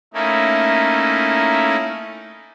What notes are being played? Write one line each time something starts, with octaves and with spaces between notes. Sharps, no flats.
A3 A#3 C#4 D#4 E4